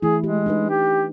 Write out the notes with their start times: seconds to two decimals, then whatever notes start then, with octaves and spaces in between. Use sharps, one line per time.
0.02 E3 A3 E4 G#4
0.24 G#3 G4
0.46 D4 D#4 B4
0.70 G4